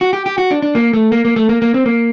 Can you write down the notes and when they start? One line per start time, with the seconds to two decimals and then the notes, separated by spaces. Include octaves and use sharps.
0.01 F#4
0.13 G4
0.26 G4
0.38 F#4
0.51 D4
0.62 D4
0.75 A#3
0.93 A3
1.12 A#3
1.25 A#3
1.36 A3
1.49 A#3
1.62 A#3
1.74 C4
1.86 A#3